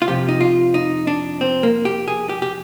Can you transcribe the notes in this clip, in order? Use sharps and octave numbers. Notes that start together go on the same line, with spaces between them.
F4
F2 C3 F3 G4
D#4
F4
D#4
D4
C4
A#3
G4
G#4
G4
G4